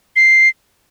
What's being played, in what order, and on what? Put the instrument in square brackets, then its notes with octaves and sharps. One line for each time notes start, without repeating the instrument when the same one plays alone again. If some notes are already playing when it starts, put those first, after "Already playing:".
[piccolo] C7